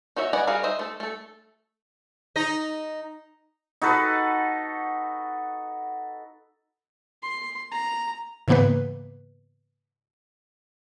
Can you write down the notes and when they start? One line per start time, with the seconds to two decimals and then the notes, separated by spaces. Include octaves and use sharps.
0.16 D#4 F#4 C#5 E5
0.33 B4 D5 D#5 F#5 G#5
0.47 G3 F#4 G#4 A#4 F5
0.64 D#4 C5 D#5 E5
0.79 A3 A4
1.00 A3 A4
2.36 D#4 D#5
3.82 D#4 F#4 A4 B4
7.23 C6
7.72 A#5
8.48 G#2 C#3 E3 A#3 B3 B4